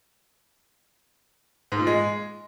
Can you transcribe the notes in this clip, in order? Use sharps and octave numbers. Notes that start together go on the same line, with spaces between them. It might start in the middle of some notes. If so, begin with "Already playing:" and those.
G#2
A#2
G#3